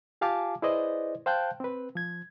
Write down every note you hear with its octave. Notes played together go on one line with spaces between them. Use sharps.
F4 G4 F5 G#5 A5 D6
E4 G#4 B4 C5 D5 D#5
C5 F5 G5 A5 F#6 G6
C4 B4
F3 G#6